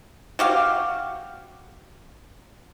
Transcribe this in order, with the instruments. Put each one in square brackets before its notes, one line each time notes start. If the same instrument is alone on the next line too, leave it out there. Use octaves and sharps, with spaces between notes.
[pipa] F#4 G4 F5